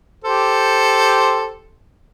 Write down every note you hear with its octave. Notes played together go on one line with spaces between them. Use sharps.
G4 A4 C5